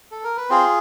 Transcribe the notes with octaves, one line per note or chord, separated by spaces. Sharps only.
A4
A#4
B4
C4 F4 G#4 C5